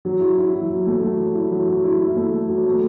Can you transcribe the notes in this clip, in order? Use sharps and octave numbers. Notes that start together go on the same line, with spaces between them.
F#3
E4
E4
F#3
F#3
A3
F#3
F#3
E4
F#3
F#3
E4
E4
A3
A3
F#3
A3